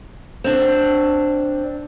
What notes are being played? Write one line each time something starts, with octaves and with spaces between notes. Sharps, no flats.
C4 D4